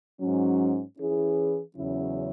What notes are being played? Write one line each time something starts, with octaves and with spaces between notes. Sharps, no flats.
G#2 F#3 C#4
E3 C#4 E4 G#4
E2 C#3 F#3 C#4 E4